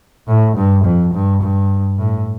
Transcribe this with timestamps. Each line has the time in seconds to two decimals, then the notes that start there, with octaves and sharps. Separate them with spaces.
0.28 A2
0.56 G2
0.84 F2
1.14 G2
1.41 G2
1.98 A2